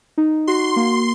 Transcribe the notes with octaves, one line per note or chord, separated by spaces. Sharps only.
D#4
F#4 C6
A#3